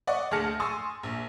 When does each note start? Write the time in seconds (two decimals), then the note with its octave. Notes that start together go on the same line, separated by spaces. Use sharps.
0.07 D5 D#5 F#5 C#6
0.31 D2 G#4 A5 F6 A#6 C#7
0.60 G#5 C6 C#6 D#6 E6 A6
1.03 A#1